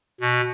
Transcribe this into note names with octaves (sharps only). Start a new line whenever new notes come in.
B2